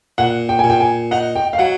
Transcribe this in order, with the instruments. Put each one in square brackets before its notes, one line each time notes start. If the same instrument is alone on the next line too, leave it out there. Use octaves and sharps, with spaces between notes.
[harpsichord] A#2 [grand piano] F#5
[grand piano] G5
G#5
[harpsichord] A#2
[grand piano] G5
G#5
[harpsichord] D#4 [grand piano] F#5
[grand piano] G5
F5
[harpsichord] F#3 [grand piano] F#5